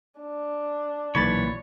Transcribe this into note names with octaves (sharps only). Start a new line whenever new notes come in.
D4
B1 A#2 E3 C#5 B5 A6